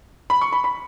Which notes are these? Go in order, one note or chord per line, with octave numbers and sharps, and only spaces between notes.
B5
C#6
B5
B5